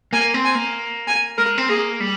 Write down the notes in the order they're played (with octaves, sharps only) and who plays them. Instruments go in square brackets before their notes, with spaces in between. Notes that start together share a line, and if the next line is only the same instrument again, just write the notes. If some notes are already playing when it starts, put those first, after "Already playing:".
[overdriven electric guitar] A#3 [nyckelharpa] G#5
[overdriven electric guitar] C4
[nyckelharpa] G#5
[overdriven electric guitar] A#3
[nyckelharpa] G#5
[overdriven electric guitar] G#3 [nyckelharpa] A#4
[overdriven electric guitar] C4
[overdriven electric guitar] A#3 [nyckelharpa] G#4
[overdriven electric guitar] G3